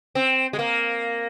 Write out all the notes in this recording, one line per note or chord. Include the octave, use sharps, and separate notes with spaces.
C4
G#3
A#3